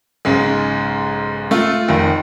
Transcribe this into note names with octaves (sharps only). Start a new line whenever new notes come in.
B1 G#2 C#3 G#3
A3 F4
F1 D#3